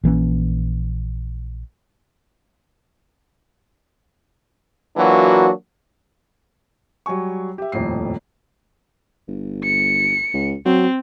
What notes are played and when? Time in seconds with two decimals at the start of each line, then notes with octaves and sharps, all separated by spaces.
0.04 A#1 E3 A#3 C#4
4.97 E3 F#3 A#3 D4 F4 F#4
7.06 F#3 G3 G#5 C#6
7.58 G4 E5
7.72 D#1 F2 A2 C7
9.28 G1
9.64 C#7
10.34 C#2
10.66 F#3 C4